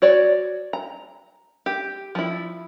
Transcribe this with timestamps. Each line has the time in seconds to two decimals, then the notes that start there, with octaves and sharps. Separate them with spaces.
0.02 F#4 C#5 D5
0.73 A#5
1.66 G4
2.15 F3 E4